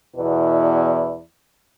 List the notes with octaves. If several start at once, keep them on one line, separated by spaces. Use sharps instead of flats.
E2 B2 E4 B4 D5